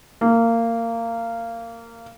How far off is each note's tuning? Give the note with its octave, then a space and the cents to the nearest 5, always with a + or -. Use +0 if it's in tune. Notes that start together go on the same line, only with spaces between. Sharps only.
A#3 -20